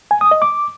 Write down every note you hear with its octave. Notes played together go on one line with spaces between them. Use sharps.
G#5
D#6
D#5
D6